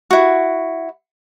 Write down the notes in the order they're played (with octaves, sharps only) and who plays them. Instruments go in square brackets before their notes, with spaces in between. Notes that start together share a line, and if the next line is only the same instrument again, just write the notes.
[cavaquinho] E4 F#4